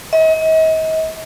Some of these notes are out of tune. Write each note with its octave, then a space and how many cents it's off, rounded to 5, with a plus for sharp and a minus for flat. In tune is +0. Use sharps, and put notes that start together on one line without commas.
D#5 +40